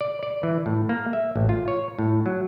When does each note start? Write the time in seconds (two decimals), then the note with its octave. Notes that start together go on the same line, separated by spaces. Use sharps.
0.01 D5
0.23 D5
0.43 E3
0.66 A2
0.89 A#3
1.13 E5
1.36 A1
1.49 F4
1.68 C#5
1.99 A2
2.26 F#3